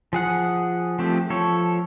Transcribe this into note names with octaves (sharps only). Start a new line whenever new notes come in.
F3 G#4 F#5
F3 A3 C4 G4
F3 A4 C#5